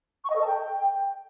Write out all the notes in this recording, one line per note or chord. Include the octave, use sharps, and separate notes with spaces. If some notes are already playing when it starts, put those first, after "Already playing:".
C#6
D#5
A4
A5
G5